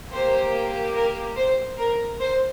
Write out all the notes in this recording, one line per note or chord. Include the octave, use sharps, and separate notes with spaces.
A#3 G4 C5
A#4
C5
A#4
C5